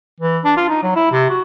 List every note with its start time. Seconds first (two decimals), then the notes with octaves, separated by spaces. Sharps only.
0.21 E3
0.45 D4
0.57 F4
0.69 D#4
0.83 F#3
0.96 E4
1.12 C3
1.30 F#4